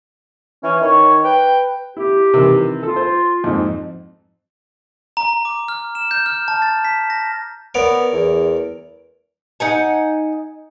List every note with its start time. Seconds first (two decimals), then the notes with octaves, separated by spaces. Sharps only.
0.63 E3 C#4
0.81 D#3 C#5
1.24 B4 G5
1.97 E4 G4
2.34 C3 D#3 E3
2.83 F4 A4
2.96 C5
3.44 F2 G#2 C4
5.17 A#5
5.45 D6
5.68 F6
5.95 E7
6.11 G6
6.26 F6
6.48 A5
6.62 A6
6.85 B6
7.10 A#6
7.75 B3 A#4 C#5 D5
8.13 E2
9.60 D#4 F#5 G#5